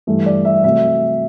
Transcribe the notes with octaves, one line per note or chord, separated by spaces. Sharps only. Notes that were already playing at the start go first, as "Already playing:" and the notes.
G2 E3 A3
D5
E5
C3 F#3 A3 E5